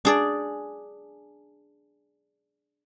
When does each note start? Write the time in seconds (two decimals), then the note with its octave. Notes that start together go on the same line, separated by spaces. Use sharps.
0.05 D4 G#4 D5